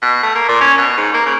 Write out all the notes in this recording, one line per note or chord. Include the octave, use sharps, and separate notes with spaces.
B2
A3
A#3
A#2
C#4
B2
G#2
A#3
C#3